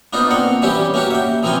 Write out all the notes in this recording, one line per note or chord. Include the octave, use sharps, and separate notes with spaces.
A#3 B3 D4 D#4 F4 C5
C4 A#4 F#5
E3 G3 C#4 E4 G4
A#3 C#4 F#4 G4
E5 G5
E3 F3 A#3 C4 A#4 G#5